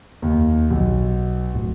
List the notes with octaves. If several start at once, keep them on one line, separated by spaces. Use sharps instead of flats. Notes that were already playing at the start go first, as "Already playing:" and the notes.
D#2
B1
D1